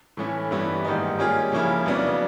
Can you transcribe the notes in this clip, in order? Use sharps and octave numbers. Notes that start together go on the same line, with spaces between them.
A2 E3 A3 C#4 E4
G2 E3 G3 B3 E4
G#2 D#3 G3 A#3 D#4
G3 A#3 C#4 F4 G#4
C#3 F3 A#3 C#4 E4
F2 C#3 F#3 B3 D4